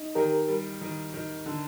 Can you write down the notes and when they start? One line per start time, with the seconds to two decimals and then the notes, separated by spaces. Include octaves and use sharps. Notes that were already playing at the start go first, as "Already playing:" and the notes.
Already playing: D#4
0.15 D#3 G4 A#4
0.48 G3
0.81 D#3
1.14 D#3
1.46 D3